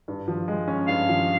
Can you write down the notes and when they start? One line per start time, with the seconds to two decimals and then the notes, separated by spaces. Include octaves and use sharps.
0.08 G2
0.28 F3
0.48 G#3
0.68 C#4
0.88 G2 F5
1.09 F3